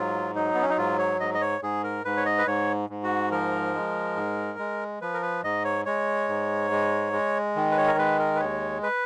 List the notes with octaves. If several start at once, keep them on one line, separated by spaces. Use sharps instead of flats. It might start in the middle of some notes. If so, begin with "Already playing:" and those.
Already playing: G#2 F#3 F4
F#3 D#4
B3
C#4
D#4
G#2 F4
C#5
G#2 D#5
D#5
C#5
G#2 G#4
A#4
G#2 B4
C#5
D#5
B4
G#2 C#5
G#2
F#4
F3 A#4
G#3
G#2
G#3
F3 B4
A#4
B4
G#2 D#5
C#5
G#3 C#5
G#2
G#3
G#3
D#3
B4
C#5
A#4
G#3 B4
A#4
B4
D#2 C#5
B4